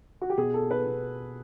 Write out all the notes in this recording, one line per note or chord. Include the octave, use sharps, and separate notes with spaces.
F#4
G4
B2 G#4
A4
B4
B2